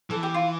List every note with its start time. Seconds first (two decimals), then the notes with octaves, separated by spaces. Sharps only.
0.10 E3 A4
0.23 G4
0.34 F4